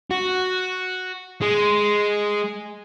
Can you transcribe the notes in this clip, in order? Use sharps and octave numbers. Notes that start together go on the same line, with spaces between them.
F#4
G#3